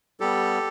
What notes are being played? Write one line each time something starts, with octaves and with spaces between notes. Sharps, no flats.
G3 B3 G4 A4